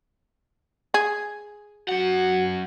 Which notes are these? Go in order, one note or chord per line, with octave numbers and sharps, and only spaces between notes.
G#4
F#2 F#4 F#5